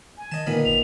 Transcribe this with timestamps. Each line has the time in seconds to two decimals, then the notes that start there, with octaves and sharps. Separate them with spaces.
0.17 G#5
0.32 D#3 D#5 A5
0.47 A#2 D3 D#3 B3
0.65 G#1 F7